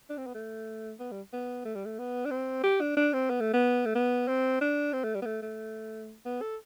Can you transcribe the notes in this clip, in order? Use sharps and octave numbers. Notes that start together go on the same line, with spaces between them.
D4
C4
B3
A3
B3
G3
B3
A3
G3
A3
B3
D4
C4
G4
D4
D4
C4
B3
A3
B3
A3
B3
C4
D4
C4
A3
G3
B3
A3
A3
B3
A4